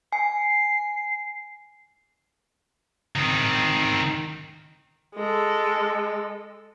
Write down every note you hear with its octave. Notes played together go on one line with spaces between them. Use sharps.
G#5 C7
D#3 C4
G#3 A4